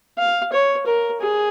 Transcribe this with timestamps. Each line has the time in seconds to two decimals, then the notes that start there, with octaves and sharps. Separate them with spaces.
0.18 F5
0.52 C#5
0.86 A#4
1.21 G#4